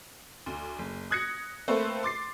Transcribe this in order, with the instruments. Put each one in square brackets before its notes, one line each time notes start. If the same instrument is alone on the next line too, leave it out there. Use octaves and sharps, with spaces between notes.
[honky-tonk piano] D2
F#1
D#6 F#6 G#6 A#6 C#7
A3 A#3 C4 A4 B4 C5
C6 D6 A6 C7